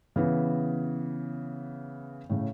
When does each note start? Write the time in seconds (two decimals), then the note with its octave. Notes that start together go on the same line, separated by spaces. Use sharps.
0.16 C#3 E3 B3
2.29 A2 C#3